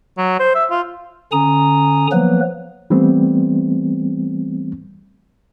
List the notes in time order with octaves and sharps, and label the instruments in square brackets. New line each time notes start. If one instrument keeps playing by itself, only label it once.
[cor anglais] F#3
C5
E5
F4
[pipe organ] D3 C#4 G#5 A#5 D#6
F3 F#3 A#3 B3 B4
[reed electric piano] E3 G3 A3 B3 C4